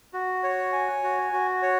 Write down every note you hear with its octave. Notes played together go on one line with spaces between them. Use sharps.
F#4
C#5
G#5
F#4
F#4
C#5